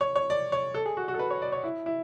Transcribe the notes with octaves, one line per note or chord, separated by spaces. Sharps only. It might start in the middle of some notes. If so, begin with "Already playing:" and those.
C#5
C#5
D5
C#5
A4
G#4
F#4
F#4
A4
B4
C#5
D5
C#5
E4
E4